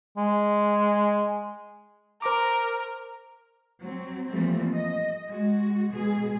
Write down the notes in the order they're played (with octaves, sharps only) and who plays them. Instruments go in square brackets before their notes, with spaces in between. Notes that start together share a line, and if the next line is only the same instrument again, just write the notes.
[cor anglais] G#3
[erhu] A#4 [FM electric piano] C5 A#5 D6
[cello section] F#3 C4
E3 F3 G3 A3 A#3 C4
D#5
G#3 F#4
B2 G#3 G#4